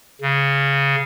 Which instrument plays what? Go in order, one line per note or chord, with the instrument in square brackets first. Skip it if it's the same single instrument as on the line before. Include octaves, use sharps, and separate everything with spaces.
[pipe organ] C#3